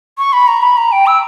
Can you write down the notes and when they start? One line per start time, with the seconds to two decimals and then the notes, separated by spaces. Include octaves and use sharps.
0.18 C#6
0.33 B5
0.48 A#5
0.62 B5
0.77 A#5
0.92 G5
1.07 E6